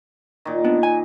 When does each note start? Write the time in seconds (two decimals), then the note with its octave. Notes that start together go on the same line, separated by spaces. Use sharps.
0.45 A#2 D#3
0.64 B3 D4
0.83 G#5